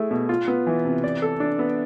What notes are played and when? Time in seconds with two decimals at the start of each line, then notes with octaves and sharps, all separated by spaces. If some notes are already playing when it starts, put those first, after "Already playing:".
Already playing: A3 E4 G#4
0.11 B2
0.29 F4
0.48 B3
0.67 E3
0.85 C3
1.04 D5
1.22 A4
1.40 D4
1.59 B3